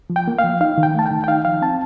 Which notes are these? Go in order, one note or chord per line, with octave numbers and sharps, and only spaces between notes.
F3
G5
A#3
F5
F3
D#4 F5
D#3
G5
A3 A5
G5
D#3
G5
D#4 F5
F3 F5
C4 A5